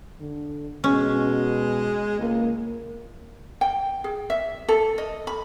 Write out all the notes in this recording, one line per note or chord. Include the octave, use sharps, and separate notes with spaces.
D3
B2 G#3 C#4
C#2 A#3
G5
G#4
E5
A4
D#5
B5